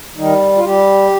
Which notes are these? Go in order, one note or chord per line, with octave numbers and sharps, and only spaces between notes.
D#3 G3 D#4
F4
G3 G4